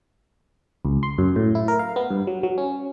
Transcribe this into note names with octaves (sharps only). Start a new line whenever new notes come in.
C#2
C6
F#2
A2
E4
A#4
F5
B3
G2
F#3
F#3
C#4